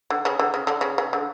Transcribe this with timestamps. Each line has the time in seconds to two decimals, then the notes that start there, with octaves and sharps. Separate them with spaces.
0.10 D3
0.25 C#3
0.39 D3
0.54 C#3
0.67 D3
0.81 C#3
0.98 C#3
1.13 D3